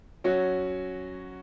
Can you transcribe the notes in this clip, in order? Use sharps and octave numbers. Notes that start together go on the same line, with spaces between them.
F#3 C#4 F#4 C#5